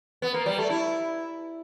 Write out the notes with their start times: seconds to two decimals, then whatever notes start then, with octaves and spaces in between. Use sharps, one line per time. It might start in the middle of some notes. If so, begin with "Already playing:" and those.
0.22 B3
0.34 A#3
0.46 G3
0.58 A3
0.70 E4